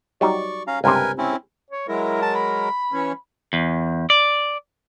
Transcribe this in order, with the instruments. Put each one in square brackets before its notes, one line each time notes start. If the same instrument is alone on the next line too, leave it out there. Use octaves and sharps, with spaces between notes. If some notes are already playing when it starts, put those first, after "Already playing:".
[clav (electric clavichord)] F#3 G3 D#4 [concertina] D5 C#6
[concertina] C#4 F5 A#5
[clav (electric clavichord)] C#2 G2 C3 [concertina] A#4 B4 G#5
[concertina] C4 C#4 E4
[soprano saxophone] C#5
[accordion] F#3 G#3 A#4 [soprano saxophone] E4
[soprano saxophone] A5
B5
[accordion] E3 C#4
[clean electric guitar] E2
D5